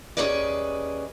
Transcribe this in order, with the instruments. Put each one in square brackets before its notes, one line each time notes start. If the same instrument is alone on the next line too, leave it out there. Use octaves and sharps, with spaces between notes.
[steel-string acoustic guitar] D#2 D#3 C#4 G#4 B4 D5